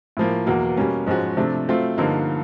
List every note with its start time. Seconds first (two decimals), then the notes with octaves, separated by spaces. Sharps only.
0.17 A2 F3 A#3
0.46 E2 B2 F#3 A#3
0.77 B2 G3 A#3 C#4
1.06 G#2 F3 G#3 C#4 F#4
1.37 C3 F3 A3 D4
1.68 F#3 A3 C4 F4
1.98 G2 D3 F3 A#3 D#4